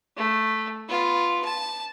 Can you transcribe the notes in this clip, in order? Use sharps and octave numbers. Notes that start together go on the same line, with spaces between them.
A3
B3 F4
A5